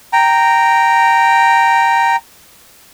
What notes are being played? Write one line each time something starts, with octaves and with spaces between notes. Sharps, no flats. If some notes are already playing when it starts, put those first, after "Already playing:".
G5 A#5